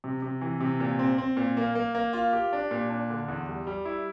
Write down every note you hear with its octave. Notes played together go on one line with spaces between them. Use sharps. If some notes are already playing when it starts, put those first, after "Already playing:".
C3
C3
E3
C3
A#2
C4
C4
A#2
A#3
A#3
A#3
F4
G4
D4
A#2
D4
D3
E2
G3
G3
E4